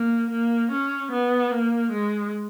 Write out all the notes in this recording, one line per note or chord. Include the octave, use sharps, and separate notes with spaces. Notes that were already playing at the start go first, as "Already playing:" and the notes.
Already playing: A#3
A#3
C#4
B3
A#3
G#3